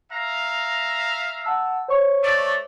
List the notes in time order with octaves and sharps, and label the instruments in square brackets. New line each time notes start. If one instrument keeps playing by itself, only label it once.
[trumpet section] E5 F5 A#5
[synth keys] F#5 A5 E6
C5 C#5 C#6
[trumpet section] A3 D5